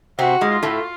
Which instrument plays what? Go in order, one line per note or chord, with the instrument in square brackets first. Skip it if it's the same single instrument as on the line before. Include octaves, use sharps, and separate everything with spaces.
[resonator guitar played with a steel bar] C3 C4 [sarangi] F#4
[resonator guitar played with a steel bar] G#2 G#3
[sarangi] F4
[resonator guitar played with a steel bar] A2 A3